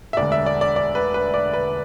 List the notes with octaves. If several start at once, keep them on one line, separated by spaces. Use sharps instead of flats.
E5
E1 D2 D3 D5
E5
D5
D5
D5
B4
B4
D5
B4